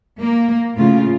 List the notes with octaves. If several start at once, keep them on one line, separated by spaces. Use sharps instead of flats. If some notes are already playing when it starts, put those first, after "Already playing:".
A#3
A2 C#3 F4